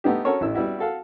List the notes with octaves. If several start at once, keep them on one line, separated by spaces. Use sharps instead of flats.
A3 B3 D#4 G4
C#4 F#4 A4 A#4 C#5
A1 E4 E6
G3 B3 E4 F#4
F#4 A4 F5 F#5